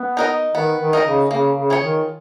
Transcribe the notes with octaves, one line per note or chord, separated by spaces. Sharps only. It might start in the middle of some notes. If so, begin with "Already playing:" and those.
Already playing: B3
D#4 A#4 D#5
D#3 B3
D#3
D#4 A#4 D#5
C#3
C#3 A#3
C#3
F4 G#4 C#5
D#3